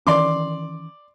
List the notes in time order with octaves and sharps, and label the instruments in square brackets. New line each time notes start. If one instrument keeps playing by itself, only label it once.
[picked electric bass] D#3 E3 C#4 [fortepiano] D5 C6 D6